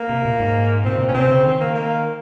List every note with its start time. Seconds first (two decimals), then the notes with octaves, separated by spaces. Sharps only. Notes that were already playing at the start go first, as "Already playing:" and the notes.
Already playing: A#3
0.09 C3
0.25 A#2
0.40 G#2
0.85 A#2 C4
0.93 C3
1.00 A#2
1.08 C#4
1.14 C3 C4
1.30 C#3
1.45 D#3 C4
1.60 A#3
1.75 A#3